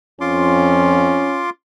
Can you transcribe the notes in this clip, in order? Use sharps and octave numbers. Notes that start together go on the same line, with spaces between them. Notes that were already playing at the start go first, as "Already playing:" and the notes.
F2 C#4 F4 C6 D6